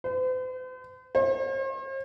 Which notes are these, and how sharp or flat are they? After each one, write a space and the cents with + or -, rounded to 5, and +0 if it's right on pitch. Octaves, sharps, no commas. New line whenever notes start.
C5 -45
C5 +45